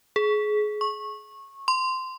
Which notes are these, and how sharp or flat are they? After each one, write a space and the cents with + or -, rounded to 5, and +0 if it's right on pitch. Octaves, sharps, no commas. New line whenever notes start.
G#4 +25
C#6 -20
C6 -15